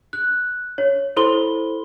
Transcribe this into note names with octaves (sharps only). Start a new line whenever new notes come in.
F#6
C#5
E4 A4 C5 B5 C6 G7